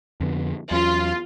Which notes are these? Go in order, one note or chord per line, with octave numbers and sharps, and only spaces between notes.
F2 D3 B3
E2 F#3 C#4 F4